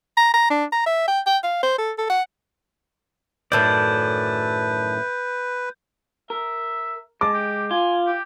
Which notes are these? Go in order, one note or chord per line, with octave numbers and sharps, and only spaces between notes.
A#5
A#5
D4
A#5
E5
G5
G5
F5
C5
A4
A4
F#5
F#2 A2 D#3 A4 B4 D5 G6
A#4 E5
G#3 A5 D6
G4
F4 G#5
G4